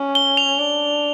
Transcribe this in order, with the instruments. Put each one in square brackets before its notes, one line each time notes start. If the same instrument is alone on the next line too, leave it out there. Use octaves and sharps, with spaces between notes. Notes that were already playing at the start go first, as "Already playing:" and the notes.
Already playing: [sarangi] C#4
[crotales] G7
F7
[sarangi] D4